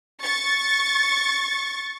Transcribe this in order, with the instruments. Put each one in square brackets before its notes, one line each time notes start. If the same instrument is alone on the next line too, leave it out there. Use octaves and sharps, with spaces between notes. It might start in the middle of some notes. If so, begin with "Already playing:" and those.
[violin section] C#6 A6